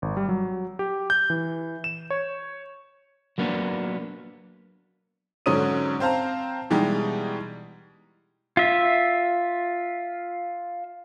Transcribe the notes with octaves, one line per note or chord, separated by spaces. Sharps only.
G#1
G3
F#3
G4
G6
E3
E7
C#5
F#3 A#3 B3 D4
G#2 D3 F#3 C#4 D#6 D#7
C4 C5 F5 A5 A#5
B2 E3 G3 G#3 D#4 G4
F4 E5